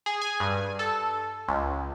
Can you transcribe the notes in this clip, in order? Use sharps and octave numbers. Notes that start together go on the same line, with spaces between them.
G#4
G#5
G2
A4
C#2